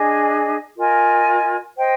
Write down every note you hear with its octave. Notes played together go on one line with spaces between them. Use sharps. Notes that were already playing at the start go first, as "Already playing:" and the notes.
Already playing: D4 G#4 D#5 G#5
F4 A#4 D#5 G#5
C5 D#5 G5